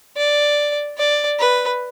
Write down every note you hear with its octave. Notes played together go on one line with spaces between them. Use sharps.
D5
D5
B4